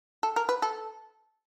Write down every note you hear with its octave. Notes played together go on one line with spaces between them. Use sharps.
A4
A#4
B4
A4